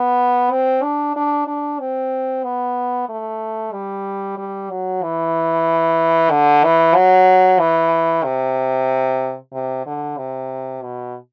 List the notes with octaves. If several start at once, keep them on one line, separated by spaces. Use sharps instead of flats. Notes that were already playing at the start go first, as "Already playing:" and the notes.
Already playing: B3
C4
D4
D4
D4
C4
B3
A3
G3
G3
F#3
E3
D3
E3
F#3
E3
C3
C3
D3
C3
B2